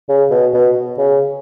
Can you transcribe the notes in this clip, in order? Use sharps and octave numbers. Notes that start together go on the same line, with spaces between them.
C#3
B2
B2
C#3